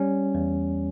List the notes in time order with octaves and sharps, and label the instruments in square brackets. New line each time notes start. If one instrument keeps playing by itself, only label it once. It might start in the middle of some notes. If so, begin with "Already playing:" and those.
Already playing: [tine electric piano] G3 C#4
E2